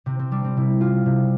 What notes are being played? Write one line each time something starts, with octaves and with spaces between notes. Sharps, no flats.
C3 C4
C4
G3 D4
C4
C3 E4
G3 F4
C3